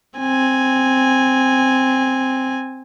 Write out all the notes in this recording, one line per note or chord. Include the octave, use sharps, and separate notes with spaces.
C4 G#5